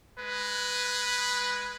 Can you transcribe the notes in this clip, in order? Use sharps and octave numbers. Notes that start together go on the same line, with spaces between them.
G#3 B4